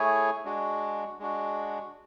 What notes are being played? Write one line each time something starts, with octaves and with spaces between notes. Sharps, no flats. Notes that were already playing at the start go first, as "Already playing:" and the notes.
Already playing: A3 E4 G#4 C#5 G#5
G#3 D4 F#4
G#3 D4 F#4